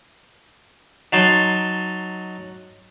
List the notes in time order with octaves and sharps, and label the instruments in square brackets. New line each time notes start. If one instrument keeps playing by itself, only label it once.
[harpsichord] F#3 D#4 A5 C6